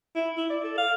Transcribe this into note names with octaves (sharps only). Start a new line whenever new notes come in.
E4
E4
D5
A4
F5